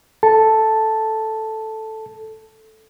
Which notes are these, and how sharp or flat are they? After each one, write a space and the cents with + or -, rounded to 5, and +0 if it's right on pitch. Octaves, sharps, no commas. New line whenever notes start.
A4 +0 A5 +0